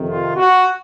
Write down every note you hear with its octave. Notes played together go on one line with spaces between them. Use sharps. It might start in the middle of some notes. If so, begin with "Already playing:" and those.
Already playing: F2 C3 D#3
F4
F#4